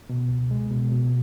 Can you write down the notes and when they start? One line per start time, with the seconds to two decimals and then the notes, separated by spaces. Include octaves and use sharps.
0.09 B2
0.30 C#2
0.51 G#3
0.71 B2
0.91 B2